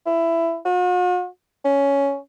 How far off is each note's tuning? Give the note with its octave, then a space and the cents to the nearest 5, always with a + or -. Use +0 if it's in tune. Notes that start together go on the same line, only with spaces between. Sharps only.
E4 +15
F#4 -45
C#4 +10